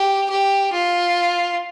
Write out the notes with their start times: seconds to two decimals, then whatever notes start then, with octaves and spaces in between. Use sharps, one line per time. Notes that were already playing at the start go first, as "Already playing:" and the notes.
Already playing: G4
0.30 G4
0.73 F4